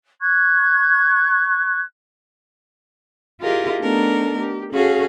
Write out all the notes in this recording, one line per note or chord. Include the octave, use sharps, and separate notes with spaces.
C#6 F#6 G#6
E4 F4 G4 G#4 A#4 D#5
A3 B3 D4 D#4 A4 A#4
G4
C#4 F#4 G#4 A4 F5